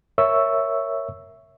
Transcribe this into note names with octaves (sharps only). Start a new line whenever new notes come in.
A#4 C#5 E5 C#6 E6